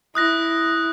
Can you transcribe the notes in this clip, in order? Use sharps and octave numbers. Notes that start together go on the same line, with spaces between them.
E4 D#6 F#6 A#6